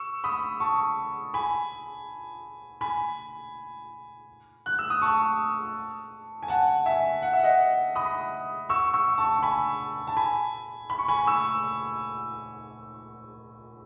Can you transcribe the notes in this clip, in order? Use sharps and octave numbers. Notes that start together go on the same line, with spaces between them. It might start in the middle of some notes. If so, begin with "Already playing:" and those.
Already playing: C#6 E6
B5 D#6
A5 C#6
G#5 B5
G#5 B5
F#6
E6
D#6
A5 C#6
G#5
F#5 A5
E5 G#5
F#5
E5
D#5 F#5
B5 D#6
C#6 E6
C#6 E6
A5 C#6
G#5 B5
A5
G#5 B5
B5
C#6
G#5 B5
C#6 E6